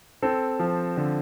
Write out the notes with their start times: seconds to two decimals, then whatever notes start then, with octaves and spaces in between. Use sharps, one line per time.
0.22 C4 A4
0.59 F3
0.97 D3